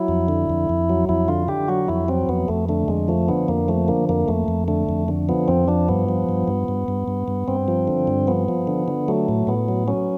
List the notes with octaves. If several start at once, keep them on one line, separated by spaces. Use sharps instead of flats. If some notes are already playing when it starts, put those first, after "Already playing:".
Already playing: F#3 E4
F2
D3
F2
F2
F#3
F2 E4
D3 F4
D3 G4
F#3 F#4
F2 E4
F#3 C4
F2 B3
F2 A3
D3 A3
F2 G#3
F3 A3
D3 B3
F2 A#3
F3 A3
D3 A#3
F2 A#3
F2 A3
F2
D3 A3
F2
D3
F3 B3
F2 C4
F3 D4
G2 B3
F3
G2
G2
G2
G2
G2
G2
G2 C4
F3
D3
G2
F3 B3
F3
D3
D3
F#3 A3
A2
A2 B3
F#3
F#3 C#4